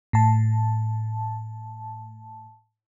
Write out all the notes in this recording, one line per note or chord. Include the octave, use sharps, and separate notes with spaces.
A2 A5